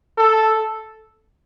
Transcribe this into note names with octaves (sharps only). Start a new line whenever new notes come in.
A4